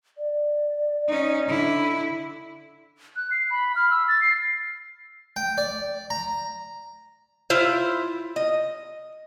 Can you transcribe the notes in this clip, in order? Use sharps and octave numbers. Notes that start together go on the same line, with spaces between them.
D5
C#4 D#4
D3 E4
F#6
C7
B5
F6
E6
A6
C7
G5
D5
A#5
E4 F4 C5
D#5